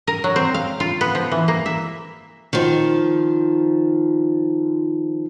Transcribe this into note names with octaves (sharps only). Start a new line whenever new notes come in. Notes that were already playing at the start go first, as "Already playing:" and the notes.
A#4
F#3
C4
F5
F4
B3
F3
E3
A#3
E5
D#3 F3